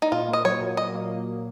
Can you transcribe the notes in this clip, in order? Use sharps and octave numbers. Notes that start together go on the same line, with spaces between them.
D#4
A#2 F4
A#3 D#5
F#3 C#5
A#2
A#2 D#5
A#3